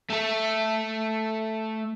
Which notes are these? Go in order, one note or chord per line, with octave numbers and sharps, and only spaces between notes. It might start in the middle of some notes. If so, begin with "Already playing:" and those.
A3 A4